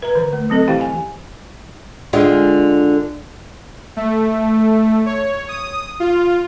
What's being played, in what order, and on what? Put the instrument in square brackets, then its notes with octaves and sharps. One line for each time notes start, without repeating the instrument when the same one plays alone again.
[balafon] B4 A#5
D3 E3 A#5
A3
F#3 C4 A4 D#5
E3 E4 G4 F5 G5
G#5
[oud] D3 G#3 F4
[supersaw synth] A3
C#5
D#6
F4